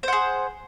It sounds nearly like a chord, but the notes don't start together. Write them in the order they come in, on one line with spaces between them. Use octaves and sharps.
C5 F#5 G#4